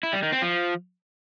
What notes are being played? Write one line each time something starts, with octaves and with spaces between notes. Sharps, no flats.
E4
G3
D#3
C4
F3